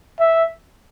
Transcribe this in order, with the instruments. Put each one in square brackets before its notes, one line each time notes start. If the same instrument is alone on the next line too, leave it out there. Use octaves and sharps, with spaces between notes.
[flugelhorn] E5